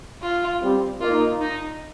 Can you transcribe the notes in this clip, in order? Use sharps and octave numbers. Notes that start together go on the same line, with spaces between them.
F4
G3 C4
A#3 D#4 F4
D#4